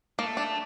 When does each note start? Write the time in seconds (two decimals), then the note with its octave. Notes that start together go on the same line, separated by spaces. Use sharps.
0.19 A3 A#3
0.37 D4